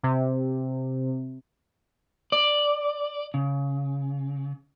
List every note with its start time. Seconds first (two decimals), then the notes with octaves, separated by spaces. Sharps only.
0.03 C3
2.32 D5
3.34 C#3